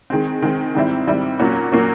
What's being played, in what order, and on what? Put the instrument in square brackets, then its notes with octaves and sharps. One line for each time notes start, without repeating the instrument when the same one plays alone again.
[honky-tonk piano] D#3 G#3 C4
D#3 G#3 C4
G#2 D#3 G3 C4 E4
G#2 D#3 G3 C4 E4
A#2 F#3 A#3 C#4 F#4
A#2 F#3 A#3 C#4 F#4